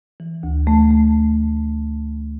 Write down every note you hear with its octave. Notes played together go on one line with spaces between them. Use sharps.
E3
D2
A3
A3